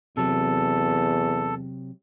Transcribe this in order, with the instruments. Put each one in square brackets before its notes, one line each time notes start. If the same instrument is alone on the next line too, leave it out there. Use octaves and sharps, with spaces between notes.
[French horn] E2 [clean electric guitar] C3 F#3 [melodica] A4